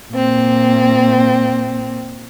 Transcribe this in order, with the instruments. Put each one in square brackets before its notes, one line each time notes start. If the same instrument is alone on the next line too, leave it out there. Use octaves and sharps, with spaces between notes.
[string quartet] A#2 C4